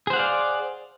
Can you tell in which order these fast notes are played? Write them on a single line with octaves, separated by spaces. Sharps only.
G#4 C5 F#5 F5 D5